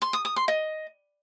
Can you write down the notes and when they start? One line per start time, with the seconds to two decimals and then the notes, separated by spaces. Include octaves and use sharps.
0.02 C6
0.13 D#6
0.25 D#6
0.36 C6
0.48 D#5